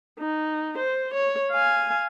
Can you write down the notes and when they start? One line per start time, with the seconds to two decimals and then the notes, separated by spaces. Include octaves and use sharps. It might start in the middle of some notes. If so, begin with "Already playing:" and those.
0.19 D#4
0.78 C5
1.14 C#5
1.52 F5 G#5